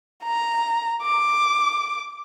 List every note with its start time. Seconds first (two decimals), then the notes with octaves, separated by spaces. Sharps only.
0.24 A#5
1.03 D6